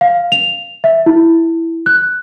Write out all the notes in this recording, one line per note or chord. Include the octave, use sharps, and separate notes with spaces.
F5
F7
E5
E4
F#6